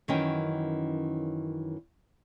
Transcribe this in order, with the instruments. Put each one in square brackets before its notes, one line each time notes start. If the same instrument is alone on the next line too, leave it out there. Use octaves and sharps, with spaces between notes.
[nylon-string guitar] F#2 D#3 E3 C#4 G5